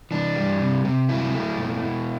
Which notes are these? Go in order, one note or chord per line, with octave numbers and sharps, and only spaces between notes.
E3 D4
G3
C3
C3
F#3 E4
A3
B2
B2